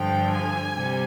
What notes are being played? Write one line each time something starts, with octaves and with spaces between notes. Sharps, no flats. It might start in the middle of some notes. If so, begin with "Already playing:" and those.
Already playing: G2 D3 F3 G5
G#5
C3 G3